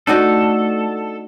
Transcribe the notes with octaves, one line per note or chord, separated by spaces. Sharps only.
A3 D4 D#4 F#4 A4